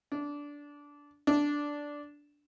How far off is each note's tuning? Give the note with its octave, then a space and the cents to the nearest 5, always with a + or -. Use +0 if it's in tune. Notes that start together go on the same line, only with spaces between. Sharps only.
D4 -15
D4 -5